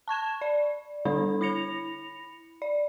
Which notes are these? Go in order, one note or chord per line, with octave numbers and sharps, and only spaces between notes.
A5 C#6 G#6 E7
D5
D3 G3 D4 A4 B5
E4 B5 A#6 C#7 F7
D5